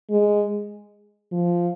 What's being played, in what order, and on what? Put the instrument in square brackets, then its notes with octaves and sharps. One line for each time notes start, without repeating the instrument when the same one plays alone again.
[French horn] G#3
F3